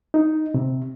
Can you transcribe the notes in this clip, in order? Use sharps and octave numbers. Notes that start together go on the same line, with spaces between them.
D#4
C3